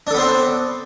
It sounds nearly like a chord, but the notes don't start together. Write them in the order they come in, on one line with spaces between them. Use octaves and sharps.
D4 A4 B3 C5 C4